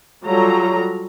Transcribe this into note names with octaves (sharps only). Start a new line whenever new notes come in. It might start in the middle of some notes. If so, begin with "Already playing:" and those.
F#3 G3 F4 A4 A#5